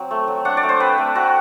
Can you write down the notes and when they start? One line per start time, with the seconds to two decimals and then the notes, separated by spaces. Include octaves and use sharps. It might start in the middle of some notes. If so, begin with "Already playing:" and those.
Already playing: F#3 C4
0.11 A3
0.28 F#3
0.45 D4 F#5
0.57 D5
0.63 A3
0.69 C5
0.80 C4 B4
0.98 A3
1.15 C4 F#4